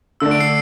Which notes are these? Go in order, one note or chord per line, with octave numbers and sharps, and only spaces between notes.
D3 A3 D4 E6
D7
C7